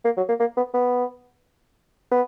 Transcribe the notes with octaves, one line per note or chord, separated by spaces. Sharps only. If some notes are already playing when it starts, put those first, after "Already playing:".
A#3
F#3
A#3
A#3
B3
B3
B3